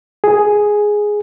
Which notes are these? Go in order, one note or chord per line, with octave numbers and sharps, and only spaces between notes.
G#4